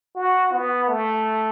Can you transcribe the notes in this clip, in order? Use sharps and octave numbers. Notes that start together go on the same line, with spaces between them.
F#4
B3
A3